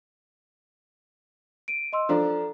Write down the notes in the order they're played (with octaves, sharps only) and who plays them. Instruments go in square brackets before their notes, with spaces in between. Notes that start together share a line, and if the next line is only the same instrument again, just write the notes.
[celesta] D7 D#7
D#5 C6 E6
[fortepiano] F3 D4 [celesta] A4 A#5